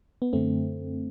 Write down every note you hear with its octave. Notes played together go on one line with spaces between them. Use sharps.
B3
F#2 D3 A3 C4